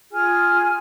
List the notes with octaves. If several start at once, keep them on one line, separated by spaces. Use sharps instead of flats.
F4 G#4 G#5 F6